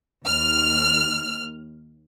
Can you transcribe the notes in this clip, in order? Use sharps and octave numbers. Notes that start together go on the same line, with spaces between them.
D#2 F6